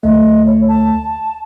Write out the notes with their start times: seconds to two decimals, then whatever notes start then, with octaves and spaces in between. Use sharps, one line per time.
0.03 D2 A3 D#5
0.46 C#5
0.68 A5